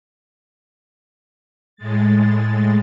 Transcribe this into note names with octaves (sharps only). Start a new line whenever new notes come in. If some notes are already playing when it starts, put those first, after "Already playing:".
A2 G#3 A6